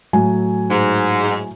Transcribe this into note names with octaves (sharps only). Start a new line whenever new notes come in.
A2 F#3 G#5
G#2